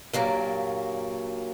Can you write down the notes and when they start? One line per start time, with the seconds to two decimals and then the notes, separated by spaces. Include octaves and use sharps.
0.13 G2 A#2 F#3 A#3